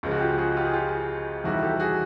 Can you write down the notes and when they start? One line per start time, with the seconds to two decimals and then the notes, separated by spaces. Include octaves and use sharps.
0.03 C#2 C#3 F3
0.11 F#4
0.21 F4 G4
0.38 F#4 G#4
0.57 F4 G4
0.65 G#4
0.73 F4 G4
1.44 E2 C3 D#3 G3 E4 F#4
1.63 G4 A4
1.80 F#4 G#4